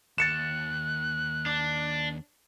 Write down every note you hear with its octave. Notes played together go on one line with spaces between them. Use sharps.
D#2 F#6 A6 C#7 E7
D4